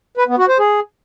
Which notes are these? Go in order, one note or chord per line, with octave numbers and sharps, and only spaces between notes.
B4
B3
F#4
C5
G#4